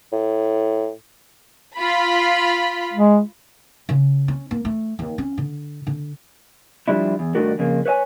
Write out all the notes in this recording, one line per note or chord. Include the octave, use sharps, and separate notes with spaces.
A2
F4 B5
G#3
C#3
C#4
A#3
A3
D#2
C#4
D3
D3
F3 G3 D4 E4
E2
G2 D#3 A3 D4 F#4 A#4
F2 C#3 A#3
B4 C#5 E5 G#5